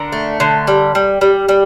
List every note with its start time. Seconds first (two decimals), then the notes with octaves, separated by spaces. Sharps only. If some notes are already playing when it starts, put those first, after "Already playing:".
Already playing: D3 A#4
0.12 A3
0.40 D3
0.67 G3
0.95 G3
1.21 G3
1.49 G3